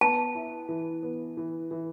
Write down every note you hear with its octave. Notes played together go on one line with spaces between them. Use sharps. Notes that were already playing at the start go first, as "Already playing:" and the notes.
B3 A5
E4
E3
B3
E3
E3